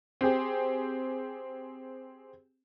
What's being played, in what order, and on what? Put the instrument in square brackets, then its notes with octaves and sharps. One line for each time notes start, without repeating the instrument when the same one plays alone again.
[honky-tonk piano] C4 G4 G#4